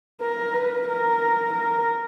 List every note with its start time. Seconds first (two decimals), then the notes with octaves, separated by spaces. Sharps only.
0.21 A#4
0.54 B4
0.88 A#4
1.54 A#4